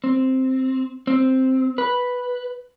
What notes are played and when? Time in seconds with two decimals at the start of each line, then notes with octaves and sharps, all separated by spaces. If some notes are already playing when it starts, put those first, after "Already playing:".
0.04 C4
1.07 C4
1.78 B4